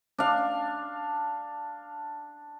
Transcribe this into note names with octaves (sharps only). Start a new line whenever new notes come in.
D4 F5